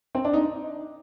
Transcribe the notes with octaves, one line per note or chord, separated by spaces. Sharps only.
C4
D4
D#4